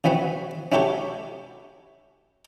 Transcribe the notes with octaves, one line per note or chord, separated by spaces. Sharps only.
C#3 E3 B3 C4 F#4
C#4 E4 F#4 G4 A4 C#5